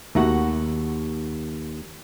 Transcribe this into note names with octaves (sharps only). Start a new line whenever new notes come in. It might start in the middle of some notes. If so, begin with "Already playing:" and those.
D#2 A3 F#4 F#5 A#5